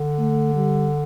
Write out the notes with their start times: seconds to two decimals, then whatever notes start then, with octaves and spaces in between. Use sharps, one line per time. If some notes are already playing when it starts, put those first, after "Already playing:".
Already playing: D3
0.19 A3
0.55 G3